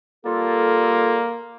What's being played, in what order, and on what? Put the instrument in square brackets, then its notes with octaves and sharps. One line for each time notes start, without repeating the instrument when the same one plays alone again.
[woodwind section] G3 F4 A4 [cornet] A#3